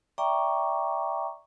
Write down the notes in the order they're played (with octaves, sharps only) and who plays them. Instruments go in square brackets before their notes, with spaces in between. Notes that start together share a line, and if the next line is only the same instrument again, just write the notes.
[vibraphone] D5 E5 G5 A#5 C#6 D6